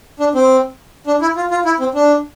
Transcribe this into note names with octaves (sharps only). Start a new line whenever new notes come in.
D4
C4
D4
E4
F4
F4
E4
C4
D4